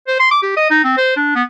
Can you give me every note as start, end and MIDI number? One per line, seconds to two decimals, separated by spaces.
0.08 0.16 72
0.20 0.31 84
0.31 0.40 86
0.43 0.53 67
0.57 0.67 75
0.70 0.80 63
0.84 0.95 60
0.97 1.15 72
1.17 1.31 62
1.36 1.43 59